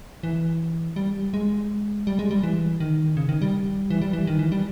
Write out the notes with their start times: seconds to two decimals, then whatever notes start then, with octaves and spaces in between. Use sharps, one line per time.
0.23 E3
0.96 G3
1.34 G#3
2.07 G3
2.19 G#3
2.31 G3
2.43 E3
2.80 D#3
3.17 C#3
3.29 D#3
3.42 G3
3.90 E3
4.01 G3
4.13 E3
4.27 D#3
4.39 E3
4.52 G3